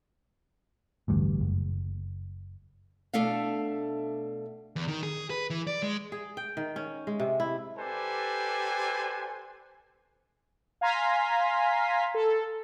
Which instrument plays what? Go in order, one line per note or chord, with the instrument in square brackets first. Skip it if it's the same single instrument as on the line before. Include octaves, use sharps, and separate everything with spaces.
[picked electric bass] A1 D2 G2
F#1
[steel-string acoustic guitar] B2 A3 D4 A4 E5 F5
[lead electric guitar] E2
D#3
G#4
B4
E3
D5
G#3
[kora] G#4
G5
D#3
C#4
G#3
C3
E4
[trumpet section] G4 A4 B4 C5 D5 G#5
[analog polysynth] F5 G#5 A#5 C6 B6
A4